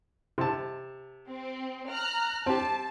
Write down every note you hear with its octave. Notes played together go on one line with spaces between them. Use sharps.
C3 A5
C4
A#5 F6 F#6
C4 G4 A5